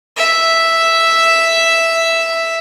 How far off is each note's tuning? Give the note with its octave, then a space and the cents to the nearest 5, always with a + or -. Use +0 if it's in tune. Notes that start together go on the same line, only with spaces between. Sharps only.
E5 +0